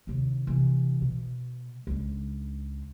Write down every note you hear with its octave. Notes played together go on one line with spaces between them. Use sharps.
D#2 C3
C3 E3
B2
C#2 D4